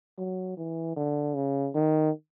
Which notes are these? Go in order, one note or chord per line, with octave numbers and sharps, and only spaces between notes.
F#3
E3
D3
C#3
D#3